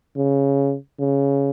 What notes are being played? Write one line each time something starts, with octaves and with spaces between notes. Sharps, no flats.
C#3
C#3